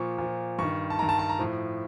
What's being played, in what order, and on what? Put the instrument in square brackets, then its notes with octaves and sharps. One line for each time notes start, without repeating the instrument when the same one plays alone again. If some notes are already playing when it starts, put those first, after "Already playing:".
Already playing: [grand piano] A#2 F3 C#6
A#2 F3
G2 D#3 C#6
A5
G2 D#3 A#5
A5
A5
A#5
A2 F3